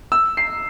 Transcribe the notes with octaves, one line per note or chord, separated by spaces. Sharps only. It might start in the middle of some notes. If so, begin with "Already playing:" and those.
E6
C7